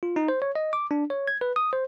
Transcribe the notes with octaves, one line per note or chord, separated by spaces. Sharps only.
F4
D#4
C5
C#5
D#5
D6
D4
C#5
G#6
B4
D#6
C5